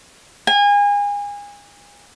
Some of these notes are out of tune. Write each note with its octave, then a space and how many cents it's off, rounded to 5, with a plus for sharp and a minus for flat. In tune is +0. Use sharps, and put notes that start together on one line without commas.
G#5 -30